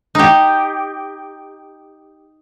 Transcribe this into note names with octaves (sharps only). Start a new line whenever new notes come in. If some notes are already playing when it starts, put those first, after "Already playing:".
D#4 G4